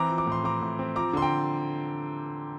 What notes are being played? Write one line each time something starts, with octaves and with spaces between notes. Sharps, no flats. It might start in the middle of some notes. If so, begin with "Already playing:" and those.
Already playing: E3 C4 A#5 D6
F3
D6
A2
C6
C4 A#5 D6
A2
C4
F3 A#5 D6
D3 C6
G5 A#5